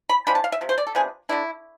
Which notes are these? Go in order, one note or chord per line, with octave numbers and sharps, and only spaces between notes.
B5
F3 G#3 D4 B5
A5
F5
E5
C3 F3
C5
D5
A4
C3 F3 B3 D4 G#4
D3 A3 D4 E4